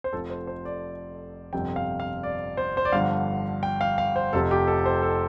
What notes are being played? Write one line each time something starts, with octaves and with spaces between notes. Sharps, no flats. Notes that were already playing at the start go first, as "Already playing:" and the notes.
C5
F1 F2 F3 A4
C5
C5
D5
G1 F2 C3 F3 G5
F5
F5
D5
C5
C5
D5
G1 G2 D3 F3 F5
G5
F5
F5
C5
F1 F2 C3 F3 A4
G4
A4
C5
A4